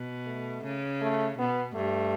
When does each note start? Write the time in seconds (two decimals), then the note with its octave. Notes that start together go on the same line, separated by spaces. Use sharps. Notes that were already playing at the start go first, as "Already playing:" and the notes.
Already playing: B2
0.27 A3
0.64 C#3
1.01 A3
1.38 B2 B3
1.75 G2 A3